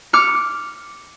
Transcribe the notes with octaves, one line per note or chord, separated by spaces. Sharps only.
D6 F6 C#7